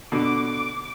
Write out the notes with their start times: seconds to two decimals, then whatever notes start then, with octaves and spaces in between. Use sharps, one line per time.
0.12 B2 D3 D6